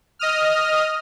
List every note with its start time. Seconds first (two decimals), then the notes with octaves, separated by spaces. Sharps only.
0.19 D#5 D#6 F6